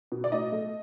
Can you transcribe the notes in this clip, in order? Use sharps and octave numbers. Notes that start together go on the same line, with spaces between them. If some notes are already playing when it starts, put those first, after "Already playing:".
B2
D5
A2 D#5
A3